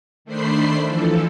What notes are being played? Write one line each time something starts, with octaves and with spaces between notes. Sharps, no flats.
D#3 A3 D4 C5 B5 C7
E3 F3 A4